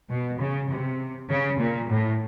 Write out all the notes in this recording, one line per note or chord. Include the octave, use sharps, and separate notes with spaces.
B2
C#3
C3
C#3
A#2
A2